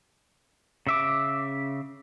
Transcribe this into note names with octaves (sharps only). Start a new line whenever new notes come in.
C#3 E5 D6